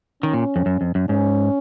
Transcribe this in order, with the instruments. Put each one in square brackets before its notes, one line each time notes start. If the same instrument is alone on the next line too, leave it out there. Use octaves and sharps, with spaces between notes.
[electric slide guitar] D#3 [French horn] C#4
[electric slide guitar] A#2
F2
F#2
F2
F#2
[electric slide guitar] G#2 [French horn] C#4